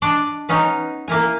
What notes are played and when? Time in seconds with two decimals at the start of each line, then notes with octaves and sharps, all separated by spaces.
0.02 D4 D5 D#5
0.49 B3 C#4 D#4
1.08 A#3 E4 A#4 G#5